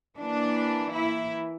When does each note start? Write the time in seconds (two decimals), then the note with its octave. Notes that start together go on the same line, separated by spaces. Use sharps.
0.19 E3 A#3 D4
0.94 E4